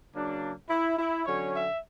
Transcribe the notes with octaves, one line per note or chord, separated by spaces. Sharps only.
C#3 F#3 A#3 D4
E4
E4
D3 F#3 C#4 C#5
E5